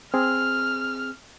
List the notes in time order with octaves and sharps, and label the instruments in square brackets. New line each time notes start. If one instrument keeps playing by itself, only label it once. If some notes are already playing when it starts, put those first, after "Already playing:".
[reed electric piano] C4 G#4 [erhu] F6